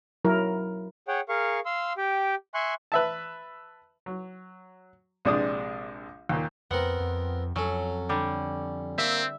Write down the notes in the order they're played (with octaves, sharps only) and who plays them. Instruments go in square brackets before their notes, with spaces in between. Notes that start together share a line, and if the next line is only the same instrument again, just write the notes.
[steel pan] F#3 E4 A#4
[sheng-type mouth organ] G#4 C#5 F#5 G5
G#4 A#4 F5 C#6
F5 C6 E6
G4 G5
E5 G#5 C6 C#6 F#6
[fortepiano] B4 E5 A5
F#3
A#1 C3 G#3 D4 D5 D#6
D#2 A#2
[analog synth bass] F2 [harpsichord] B3 C4 A#4 [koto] F#5
[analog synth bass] F2
[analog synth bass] F2 [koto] F#3 [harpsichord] C#4 A4
[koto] D3 G3
[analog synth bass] A#3 [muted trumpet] C4 [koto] E5